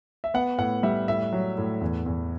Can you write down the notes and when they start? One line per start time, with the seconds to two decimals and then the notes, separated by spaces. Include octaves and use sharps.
0.24 E5
0.34 B3 F#5
0.58 A2 F#5
0.83 G3 E5
1.08 A2 E5
1.33 F#3
1.58 A2
1.81 E2
2.06 E2